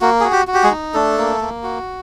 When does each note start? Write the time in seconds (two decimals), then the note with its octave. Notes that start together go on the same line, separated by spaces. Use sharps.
0.01 A#3 F#4
0.20 F#4 G#4
0.32 G4
0.47 F#4
0.54 G4
0.63 G#3 G#4
0.71 D#4
0.94 A3 D4 A4
1.18 A#3
1.41 A#3
1.63 F#4